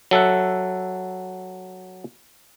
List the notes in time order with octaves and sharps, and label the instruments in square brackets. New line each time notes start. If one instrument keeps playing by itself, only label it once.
[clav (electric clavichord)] F#3 A4 E5 F#5